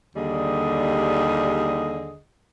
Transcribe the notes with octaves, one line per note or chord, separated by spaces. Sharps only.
D#2 D3 G3 G#4 D#5